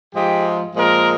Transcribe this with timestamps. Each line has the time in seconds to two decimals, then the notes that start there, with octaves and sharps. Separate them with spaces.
0.13 G#2 F3 G#3 G4
0.75 A#2 F3 G#3 A#4